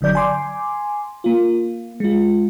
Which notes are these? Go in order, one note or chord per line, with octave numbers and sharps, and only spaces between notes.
G1 D3 F#3 D5 G6
G#5 C6 D6
A#3 F4
G#3 F4